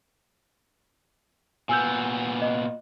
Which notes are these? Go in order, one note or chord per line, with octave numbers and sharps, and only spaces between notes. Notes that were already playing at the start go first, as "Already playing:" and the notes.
A#2 B3 G#5 E6 G6
D#5